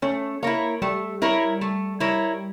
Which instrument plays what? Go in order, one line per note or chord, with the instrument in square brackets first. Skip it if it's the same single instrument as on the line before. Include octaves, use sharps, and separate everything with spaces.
[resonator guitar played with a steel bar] A3 [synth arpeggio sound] C#4
[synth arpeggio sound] A#3 [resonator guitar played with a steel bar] E4 A#4 C#5
[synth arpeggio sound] G3 [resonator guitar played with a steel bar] A3
[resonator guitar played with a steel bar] E4 A#4 C#5
A3
E4 A#4 C#5